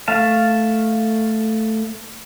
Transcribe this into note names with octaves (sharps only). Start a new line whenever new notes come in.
A3 F5 A5